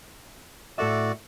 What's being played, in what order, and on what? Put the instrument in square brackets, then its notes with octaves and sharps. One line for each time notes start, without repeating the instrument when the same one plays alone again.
[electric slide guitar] A2 A4 E5 [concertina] F#4 D5